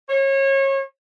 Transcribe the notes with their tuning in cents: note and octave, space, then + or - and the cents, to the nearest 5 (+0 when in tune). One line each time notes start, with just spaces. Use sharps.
C#5 -30